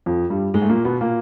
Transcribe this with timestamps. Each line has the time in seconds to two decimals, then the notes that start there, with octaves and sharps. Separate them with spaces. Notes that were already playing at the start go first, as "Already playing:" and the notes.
0.06 F2 F3
0.30 G2 G3
0.54 G#2 G#3
0.62 A3
0.69 A#2 A#3
0.85 B2 B3
1.01 A#2 A#3